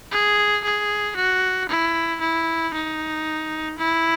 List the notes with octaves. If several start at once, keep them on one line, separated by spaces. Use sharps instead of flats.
G#4
G#4
F#4
E4
E4
D#4
E4